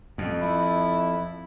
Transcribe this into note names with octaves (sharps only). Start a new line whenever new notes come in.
F2
E4